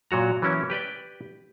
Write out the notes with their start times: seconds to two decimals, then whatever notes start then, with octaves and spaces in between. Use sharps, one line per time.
0.11 A#2 F#3 F#4 A#5
0.42 E3 F#3 A#3 C#4 E4
0.70 G4 B4 D5 G5